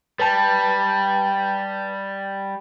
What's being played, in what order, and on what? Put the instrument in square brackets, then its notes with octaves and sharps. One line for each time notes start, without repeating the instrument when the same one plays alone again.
[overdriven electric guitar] G3 [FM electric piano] B4 A5